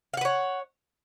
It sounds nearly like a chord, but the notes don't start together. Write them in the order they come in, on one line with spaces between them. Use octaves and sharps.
F5 F#5 B4 C#5